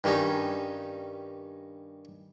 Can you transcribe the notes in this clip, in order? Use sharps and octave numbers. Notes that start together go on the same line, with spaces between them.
G2 D#3 G3 C#4 D#4